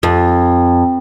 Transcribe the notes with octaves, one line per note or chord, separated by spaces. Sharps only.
F2